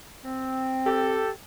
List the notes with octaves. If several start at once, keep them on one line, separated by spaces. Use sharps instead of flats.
C4
G4 A4